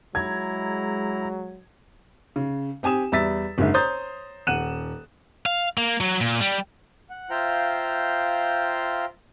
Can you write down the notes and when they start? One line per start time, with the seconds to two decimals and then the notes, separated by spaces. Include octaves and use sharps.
0.15 F#3 G#3 E4 A#5 G#6
2.36 C#3
2.83 C4 G4 G#5 D#6 E7
3.12 E2 G3 E5 E6 A6 B6
3.58 F#1 G#2 D3 G#3 E5
3.74 C5 C#5 A#5 D#6 G6 A6
4.47 D#1 F#5 F#6 D#7 E7
5.46 F5
5.78 A#3
6.01 F#3
6.21 A#2
6.40 G3
7.10 F#5
7.30 F4 C5 E5 F5 G5 A#5